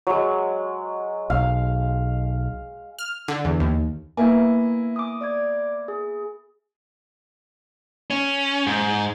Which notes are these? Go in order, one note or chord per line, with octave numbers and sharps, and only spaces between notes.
F#3 G#3
B1 F5
F6
D3
E2
D#2
A#3 B3 E4 E5 G#5
D6 D#6
D5 D6 G#6
G#4
C#4
G#2